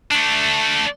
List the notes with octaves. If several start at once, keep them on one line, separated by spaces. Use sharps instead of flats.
A3 D4